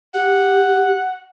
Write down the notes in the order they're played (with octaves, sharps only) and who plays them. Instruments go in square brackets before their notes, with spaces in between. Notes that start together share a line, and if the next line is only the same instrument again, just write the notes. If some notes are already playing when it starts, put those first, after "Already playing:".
[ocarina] G4 [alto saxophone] F#5